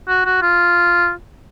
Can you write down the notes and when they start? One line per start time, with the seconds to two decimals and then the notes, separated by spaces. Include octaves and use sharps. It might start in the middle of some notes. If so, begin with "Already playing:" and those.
0.08 F#4
0.25 F#4
0.42 F4